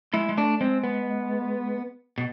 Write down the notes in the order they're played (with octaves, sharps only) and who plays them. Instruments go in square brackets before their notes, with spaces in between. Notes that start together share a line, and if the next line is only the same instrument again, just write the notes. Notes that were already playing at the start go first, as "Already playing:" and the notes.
[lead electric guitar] G#3 [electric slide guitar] E4
[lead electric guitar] G#3
[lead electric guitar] A3 [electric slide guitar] D4
[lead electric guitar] G#3 [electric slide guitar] C4
[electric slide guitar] B3
[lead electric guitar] B2